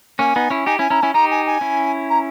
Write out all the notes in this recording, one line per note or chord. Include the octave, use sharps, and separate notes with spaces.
A#3 C#4 G#5
B3 D#4
C#4 E4
D#4 G4 G#5
C#4 E4 G#5
C#4 E4 A#5
C#4 E4 G#5
D#4 G4 A#5
G#5
G#5
C#4 E4
A#5